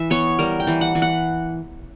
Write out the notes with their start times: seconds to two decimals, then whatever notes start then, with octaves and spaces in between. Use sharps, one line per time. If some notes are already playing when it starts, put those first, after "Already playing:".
Already playing: E3 E5
0.10 B3 C#5
0.39 G3 A#4
0.60 G5
0.67 E3
0.81 F#5
0.95 E3
1.02 F#5